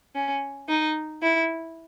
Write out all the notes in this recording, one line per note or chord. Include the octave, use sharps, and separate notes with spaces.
C#4
D#4
E4